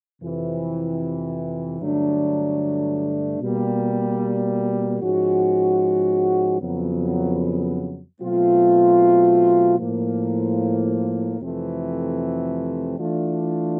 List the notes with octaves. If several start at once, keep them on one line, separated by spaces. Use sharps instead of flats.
F2 C3 E3
G2 D3 F#3 A3 D4
B2 G3 A#3
G#2 F3 G#3 C#4 F#4
F2 C#3 F#3 B3
B2 F#3 A3 C4 F4
A2 F3 A#3
F2 C3 E3 A3 C4
E3 A3 D4 F4